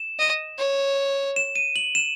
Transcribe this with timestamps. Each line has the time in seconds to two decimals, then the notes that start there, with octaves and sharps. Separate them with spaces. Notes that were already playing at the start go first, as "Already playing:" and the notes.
Already playing: E7
0.19 D#5
0.58 C#5
1.36 E7
1.56 D#7
1.76 F#7
1.95 E7